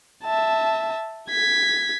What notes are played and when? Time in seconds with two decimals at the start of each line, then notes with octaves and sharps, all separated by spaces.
0.24 E5 A5
1.29 G#6 B6